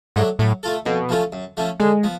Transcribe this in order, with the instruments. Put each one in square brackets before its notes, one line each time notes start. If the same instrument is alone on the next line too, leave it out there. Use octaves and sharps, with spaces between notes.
[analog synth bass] G#2 [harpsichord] F#3 A3 D4
[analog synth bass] A2 [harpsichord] F#3
[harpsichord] A3 F4 A4
[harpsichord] F2 [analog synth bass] B2
[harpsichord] F3 A3 C#4 F4
F#2
F3 A3 C#4
[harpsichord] D3 [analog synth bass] G#3
[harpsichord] F3 B3